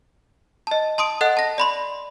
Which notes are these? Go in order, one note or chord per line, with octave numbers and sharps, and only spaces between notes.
D#5 A5
A5 C6 D#6 D7
A4 D#5 F#5 F#6
A5 A#6
D5 B5 C6